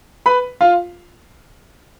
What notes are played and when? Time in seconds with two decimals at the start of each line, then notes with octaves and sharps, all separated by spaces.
0.26 B4 B5
0.61 F4 F5